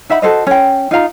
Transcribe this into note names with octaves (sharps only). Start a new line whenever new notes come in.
D#4 E5 F#5 B5
F#4 A4 C5 D#5
C#4 G5
D#4 F4 F5 A#5